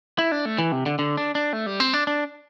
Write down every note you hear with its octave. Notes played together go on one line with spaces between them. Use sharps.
E4
D4
A3
E3
C3
D3
D3
D4
D4
A3
G3
C4
D4
D4